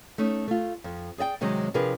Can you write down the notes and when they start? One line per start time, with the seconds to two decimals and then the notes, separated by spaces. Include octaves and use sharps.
0.18 A3 C#4 D#4
0.48 A3 F4
0.84 F2
1.18 G#4 D5 D#5 G5
1.41 C3 D#3 F#3 G#3 C4
1.74 C3 F3 D4 G#4 A#4 B4